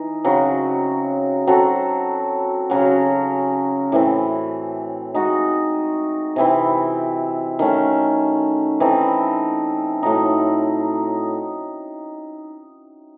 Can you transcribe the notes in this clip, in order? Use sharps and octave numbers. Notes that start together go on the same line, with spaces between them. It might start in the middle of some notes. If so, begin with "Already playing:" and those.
Already playing: E3 D#4
C#3 F#3 C4 F#4
F#3 C4 F#4 A4
C#3 F#3 C#4 F#4
A2 E3 C4
G#3 D#4 F#4
C3 E3 C4 E4
D#3 A3 C#4
E3 C4 D#4 A4
A2 F#3 A3 D#4